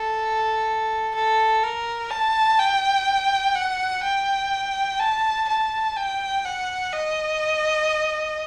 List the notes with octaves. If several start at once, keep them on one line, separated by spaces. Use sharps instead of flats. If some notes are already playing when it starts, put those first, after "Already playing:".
Already playing: A4
A4
A#4
A5
G5
F#5
G5
A5
A5
G5
F#5
D#5